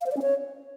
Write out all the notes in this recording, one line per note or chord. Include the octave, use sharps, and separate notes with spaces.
F5
C5
D5
C#4
C#5